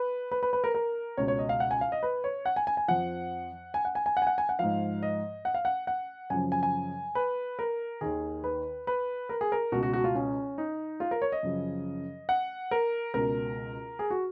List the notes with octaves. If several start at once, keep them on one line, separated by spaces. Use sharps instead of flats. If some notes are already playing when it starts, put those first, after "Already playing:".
Already playing: B4
B4
B4
B4
A#4
A#4
C#2 B2 C#5
C#5
D#5
F5
F#5
G#5
F5
D#5
B4
C#5
F#5
G#5
G#5
G#5
F2 F3 F#5
G#5
F#5
G#5
G#5
F#5
G#5
F#5
G#5
F#5
G#2 F3 F5
D#5
F#5
F5
F#5
F#5
F#2 C#3 F3 G#5
G#5
G#5
B4
A#4
D#2 D#3 G#4
B4
B4
A#4
G#4
A#4
C#2 B2 F#4
F#4
F#4
F4
C#4
D#4
F4
A#4
C#5
D#5
F#2 C#3 F3
F#5
A#4
C#2 B2 A#4
G#4
F#4